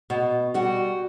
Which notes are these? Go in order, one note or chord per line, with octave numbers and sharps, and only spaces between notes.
B2
G3 F#4